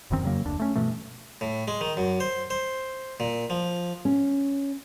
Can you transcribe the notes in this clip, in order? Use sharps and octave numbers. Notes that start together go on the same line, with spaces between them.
E1 F#2 D#3 C4
F2 C#3 F#3 A#3
F1 D2 D4
A3 C#4
G2 B2 E3 A3
A2
G#3
D#3
F#2
C5
C5
A#2
F3
C#4